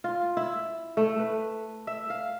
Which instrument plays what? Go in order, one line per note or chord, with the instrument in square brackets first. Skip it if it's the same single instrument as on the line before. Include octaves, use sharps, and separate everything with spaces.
[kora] F4
E4
A3
B4
E5
F5